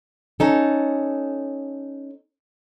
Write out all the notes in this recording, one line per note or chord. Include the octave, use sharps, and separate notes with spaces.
C#4 D#4 A4